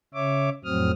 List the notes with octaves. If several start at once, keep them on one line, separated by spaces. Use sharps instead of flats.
C#3 C#5 E5 D6
F2 A2 F#3 C4 D#6 F6